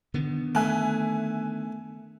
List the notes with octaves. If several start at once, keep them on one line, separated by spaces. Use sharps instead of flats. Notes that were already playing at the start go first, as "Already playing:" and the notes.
D3 D#3 B3
A3 E5 G#5 F#6